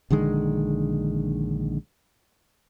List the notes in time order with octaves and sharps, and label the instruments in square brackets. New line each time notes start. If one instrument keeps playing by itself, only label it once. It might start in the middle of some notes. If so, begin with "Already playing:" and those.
[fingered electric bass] A#1 D3 D#3 G#3